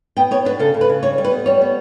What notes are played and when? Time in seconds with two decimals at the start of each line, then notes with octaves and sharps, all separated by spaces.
0.17 B3 G5
0.31 B3 C#5
0.45 D4 B4
0.60 C#3 A4
0.74 C#3
0.81 B4
0.89 C#3
1.03 G3 C#5
1.18 G3
1.25 B4
1.32 B3
1.46 G3 C#5
1.61 B3